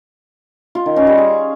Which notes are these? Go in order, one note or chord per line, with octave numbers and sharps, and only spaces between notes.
F4
D#3
C#4
G3
G#4